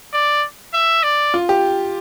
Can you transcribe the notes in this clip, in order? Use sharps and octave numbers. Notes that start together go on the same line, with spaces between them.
D5
E5
D5
F4
G4